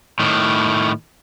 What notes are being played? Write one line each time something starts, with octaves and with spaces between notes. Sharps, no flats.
A2 D#3